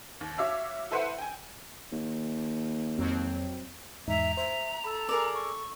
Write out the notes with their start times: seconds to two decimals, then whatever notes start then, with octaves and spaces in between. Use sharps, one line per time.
0.21 D#2
0.38 F#4 C#5 E5 F5 D6 E6
0.91 E4 A4 B4 C5 E5 F#5
1.18 G5 G#5
1.92 D#2
2.98 F2 F#3 C4
4.08 E2 G#2 D#4 E5 A#5
4.37 C5 E5
4.84 A4 B5 E6
5.09 G#4 A#4 D5
5.34 C#6